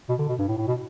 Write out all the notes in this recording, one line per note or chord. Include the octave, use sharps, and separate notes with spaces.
B2
D3
B2
G2
A2
A2
B2